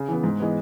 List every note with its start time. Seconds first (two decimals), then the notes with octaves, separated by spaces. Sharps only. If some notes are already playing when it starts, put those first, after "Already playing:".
Already playing: C#3
0.08 E3 B3
0.24 G#2
0.40 E3 G#3 B3